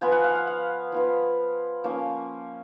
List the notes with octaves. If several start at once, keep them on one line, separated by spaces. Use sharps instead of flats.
F3 B3 F4 G#5
F#5
F5
F#5
F5
F3 B3 F4
F3 A#3 C#4